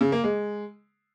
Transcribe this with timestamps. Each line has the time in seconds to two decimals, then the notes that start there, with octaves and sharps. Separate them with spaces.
0.01 C#3
0.12 A#3
0.24 G#3